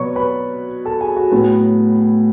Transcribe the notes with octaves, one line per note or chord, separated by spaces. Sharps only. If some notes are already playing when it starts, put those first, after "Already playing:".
Already playing: B2 F#3 B3 C#5 D5 C#6
B4 B5
A4 A5
G#4 G#5
F#4 F#5
A2 F#3 B3